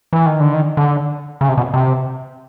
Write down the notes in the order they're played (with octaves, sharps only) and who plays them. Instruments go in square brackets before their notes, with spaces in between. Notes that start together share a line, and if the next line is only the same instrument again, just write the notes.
[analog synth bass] E3
D#3
D3
D#3
D3
C#3
C3
B2
C3